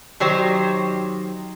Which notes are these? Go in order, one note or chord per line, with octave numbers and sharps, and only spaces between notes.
D#3 F#3 G4 C5